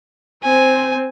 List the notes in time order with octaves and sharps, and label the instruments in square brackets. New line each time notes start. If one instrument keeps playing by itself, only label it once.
[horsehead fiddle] C4 C5 [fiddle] G#5